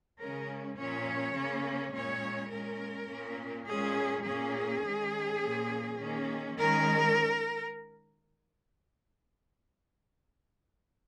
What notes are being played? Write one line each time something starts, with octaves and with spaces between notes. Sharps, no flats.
C#3 G#3 C#4 A#4
A#2 F3 C#4 C#5
C#3 A#3 C#4
A#2 G#3 C#4 C#5
A#2 G#3 C#4 A#4
A#2 A#3 C#4
A#2 G#3 C#4 G#4
A#2 A#3 C#4 G#4
D#3 G#3 C#4
A#2 F3 A#3 C#4
D#3 A#3 C#4
D#3 G#3 C#4 A#4